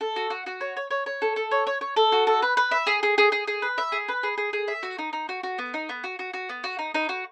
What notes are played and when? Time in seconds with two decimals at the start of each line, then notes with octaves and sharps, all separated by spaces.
0.01 A4
0.16 F#4
0.30 F#4
0.46 F#4
0.61 C#5
0.77 C#5
0.91 C#5
1.06 C#5
1.22 A4
1.36 A4
1.51 C#5
1.67 C#5
1.81 C#5
1.96 A4
2.12 F#4
2.27 A4
2.42 B4
2.57 B4
2.71 E5
2.87 G#4
3.03 G#4
3.18 G#4
3.32 G#4
3.47 G#4
3.62 B4
3.78 E5
3.92 G#4
4.08 B4
4.23 G#4
4.38 G#4
4.53 G#4
4.68 E5
4.83 F#4
4.99 D#4
5.13 D#4
5.29 F#4
5.43 F#4
5.59 B3
5.74 D#4
5.89 B3
6.04 F#4
6.19 F#4
6.34 F#4
6.49 B3
6.64 F#4
6.79 D#4
6.94 D#4
7.09 F#4